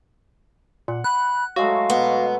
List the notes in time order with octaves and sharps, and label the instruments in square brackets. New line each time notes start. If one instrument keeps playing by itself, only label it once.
[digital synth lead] A#2 [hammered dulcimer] F#5
[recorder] B5 [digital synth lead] F#6
[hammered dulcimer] F#3 G#3 A3 [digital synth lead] F#4 [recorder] F5
[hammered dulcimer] B2 [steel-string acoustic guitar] B3